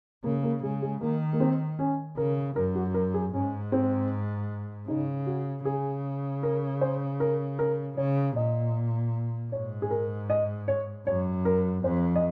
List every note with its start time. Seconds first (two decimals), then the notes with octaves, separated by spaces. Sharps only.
0.24 C#3 A#3
0.43 A#3
0.63 C#3 G#3
0.82 G#3
1.01 D#3 A#3
1.33 A#3
1.40 C4
1.79 C#4
2.17 C#3 A#4
2.56 F#2 A#4
2.75 F#4
2.94 A#4
3.14 G#4
3.33 G#2 C#4
3.72 C4
4.88 C#3 D#4
5.27 F#4
5.65 C#3 G#4
6.43 A#4
6.81 C5
7.20 A#4
7.59 A#4
7.97 C#3 C#5
8.36 A#2 D#5
9.52 G#2 C#5
9.82 G#4
9.91 A#4
10.30 D#5
10.68 C#5
11.07 F#2 C#5
11.45 A#4
11.84 F2 C5
12.16 D#5